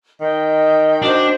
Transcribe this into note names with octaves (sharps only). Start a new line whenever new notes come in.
D#3 D#5 G5
D4 F#4 C5